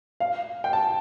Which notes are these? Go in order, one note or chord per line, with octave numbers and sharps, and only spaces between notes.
F5
G5
A5